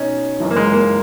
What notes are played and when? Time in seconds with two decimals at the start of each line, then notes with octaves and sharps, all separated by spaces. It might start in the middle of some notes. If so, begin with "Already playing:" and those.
Already playing: B2 C#4 D#4
0.40 F#1 F#2 E3
0.50 A#3
0.57 G#3
0.73 A#3